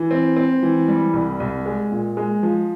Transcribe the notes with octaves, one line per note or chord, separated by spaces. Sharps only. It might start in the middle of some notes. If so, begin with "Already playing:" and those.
Already playing: E3
C4
C4
E3
G3
C2
C2
G#3
A#2
G#3
F3